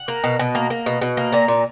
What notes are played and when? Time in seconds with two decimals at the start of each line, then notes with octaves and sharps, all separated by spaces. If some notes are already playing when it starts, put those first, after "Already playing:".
Already playing: F#5
0.08 A#3
0.24 B2
0.39 B2
0.55 A#3
0.70 A#3
0.86 B2
1.01 B2
1.17 A#3
1.32 A#2 A#5
1.48 A#2